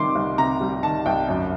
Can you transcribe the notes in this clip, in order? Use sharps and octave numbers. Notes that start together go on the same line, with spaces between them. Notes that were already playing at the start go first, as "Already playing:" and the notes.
Already playing: C3 D#3 G3 C6 D6
C2
C3 A#5
G3
D#3 A5
C2 G5
F#2